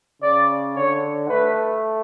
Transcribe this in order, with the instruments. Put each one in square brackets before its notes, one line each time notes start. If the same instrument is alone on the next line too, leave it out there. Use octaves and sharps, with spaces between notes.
[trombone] C#3 [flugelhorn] D5
[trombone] D3 [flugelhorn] C#5
[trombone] A3 [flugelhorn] B4